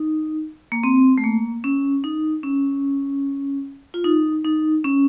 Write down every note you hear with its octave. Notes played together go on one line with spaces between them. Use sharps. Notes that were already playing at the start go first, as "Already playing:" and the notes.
Already playing: D#4
A#3
C4
A3
A#3
C#4
D#4
C#4
F4
D#4
D#4
C#4